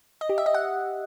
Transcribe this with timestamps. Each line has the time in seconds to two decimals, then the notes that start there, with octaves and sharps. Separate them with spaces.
0.21 D#5
0.29 G4
0.38 E5
0.46 D#5
0.54 F#5